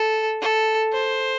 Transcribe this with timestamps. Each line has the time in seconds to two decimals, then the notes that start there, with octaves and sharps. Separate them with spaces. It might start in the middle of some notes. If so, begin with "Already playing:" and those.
Already playing: A4
0.41 A4
0.93 C5